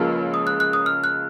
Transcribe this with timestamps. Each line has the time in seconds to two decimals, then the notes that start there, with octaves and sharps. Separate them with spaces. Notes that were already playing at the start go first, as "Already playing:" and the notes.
Already playing: C#2 C#3 F3 A#3 F6
0.34 D#6
0.47 F#6
0.60 F#6
0.73 D#6
0.86 F6
1.04 F#6